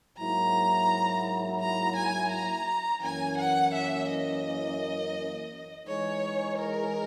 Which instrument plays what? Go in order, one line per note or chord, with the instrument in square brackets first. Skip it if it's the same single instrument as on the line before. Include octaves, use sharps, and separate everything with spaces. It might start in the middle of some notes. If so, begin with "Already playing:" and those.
[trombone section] G#2 F#3 A#3 E4 [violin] A#5
[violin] A#5
G#5
A#5
[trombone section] F#2 E3 A#3 C#4 [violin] G#5
[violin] F#5
E5
D#5
[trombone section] E3 G#3 D#4 G#4 [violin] C#5
[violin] A#4